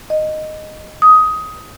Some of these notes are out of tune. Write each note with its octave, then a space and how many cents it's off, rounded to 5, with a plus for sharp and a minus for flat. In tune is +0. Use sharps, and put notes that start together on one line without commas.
D#5 -10
D#6 +15